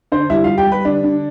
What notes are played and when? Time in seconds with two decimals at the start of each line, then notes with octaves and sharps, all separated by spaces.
0.12 D3 C5
0.30 G3 E4 E5
0.44 G3 F4 F5
0.57 G4 G5
0.66 G3
0.72 B4 B5
0.85 D3 D4 D5
1.04 D3